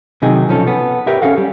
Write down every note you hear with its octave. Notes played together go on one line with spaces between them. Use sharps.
C3 D#3 F#3 D#4 G#4
B1 F3 C#4 A4
B3 A4
G4 A#4 B4 C#5 E5
C#4 D#4 G#4 A4 F5 F#5
G3